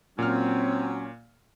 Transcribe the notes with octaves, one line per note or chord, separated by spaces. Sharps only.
A#2 F#3 C4 C#4 F6